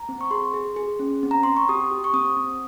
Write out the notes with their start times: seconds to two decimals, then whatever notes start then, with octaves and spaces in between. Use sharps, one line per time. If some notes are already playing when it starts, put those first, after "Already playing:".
Already playing: A#5
0.09 C4
0.21 C#6
0.31 G#4 C6
0.54 G#4
0.76 G#4
0.99 C#4
1.23 C4
1.31 A#5
1.43 C4 C6
1.57 C#6
1.69 G4 D#6
1.91 G4
2.04 C#6
2.14 C4 D#6
2.36 C4